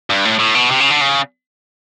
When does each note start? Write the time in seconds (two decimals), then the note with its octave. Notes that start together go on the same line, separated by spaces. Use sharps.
0.10 G2
0.25 A2
0.39 A2
0.54 B2
0.71 C3
0.80 C#3
0.90 D3
1.01 C#3